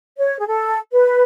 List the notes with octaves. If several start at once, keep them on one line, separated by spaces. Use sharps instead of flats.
C#5
G#4
A4
B4